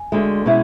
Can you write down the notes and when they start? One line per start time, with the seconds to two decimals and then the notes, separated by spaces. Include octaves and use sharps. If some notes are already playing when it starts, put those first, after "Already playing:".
Already playing: G#5
0.12 D2 D3 G#3
0.46 B2 G#3 C#4 E4